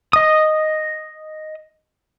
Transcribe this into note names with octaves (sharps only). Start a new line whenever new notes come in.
D#5 D#6